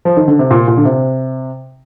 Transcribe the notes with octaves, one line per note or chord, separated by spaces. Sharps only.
F3
D#3
D3
C3
A#2
A#2
D3
C3